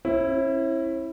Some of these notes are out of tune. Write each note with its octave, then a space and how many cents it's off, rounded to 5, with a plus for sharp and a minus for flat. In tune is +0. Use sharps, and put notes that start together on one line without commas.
C#4 -45 E4 +0